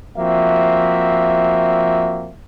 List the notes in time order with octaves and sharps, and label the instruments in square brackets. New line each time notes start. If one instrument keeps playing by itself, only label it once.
[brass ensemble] F3 A#3 C4 F#4 E5